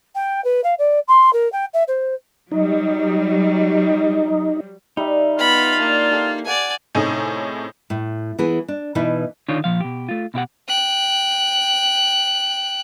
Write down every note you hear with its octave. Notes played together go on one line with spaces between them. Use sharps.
G5
B4
F5
D5
C6
A#4
G5
E5
C5
F#3 G3 D#4
G3 D#4 E5
B3 F4 B5
A#3 D4
G4 A4
A4 D5 F#5 G#5
A2 C3 C#4 D#4 G#4
A2
E3 B3 G#4
D4
B2 E3 D#4 E4 B4
D3 D#3 D4 D#4 F4 C#5
A#2 F3 F5
B2 G4
A3 F4
B2 E4 G4 F#5
G5 F#6